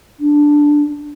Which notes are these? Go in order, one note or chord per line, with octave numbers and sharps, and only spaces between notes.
D4